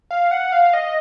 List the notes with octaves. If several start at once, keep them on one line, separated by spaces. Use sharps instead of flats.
F5
F#5
F5
D#5